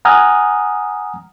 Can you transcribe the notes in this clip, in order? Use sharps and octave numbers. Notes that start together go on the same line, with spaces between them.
F#5 G#5 A#5 D#6 F6